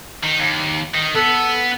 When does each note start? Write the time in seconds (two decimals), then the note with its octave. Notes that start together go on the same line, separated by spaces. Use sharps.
0.23 D#3
0.39 D#2
0.95 D#3
1.15 B3 A4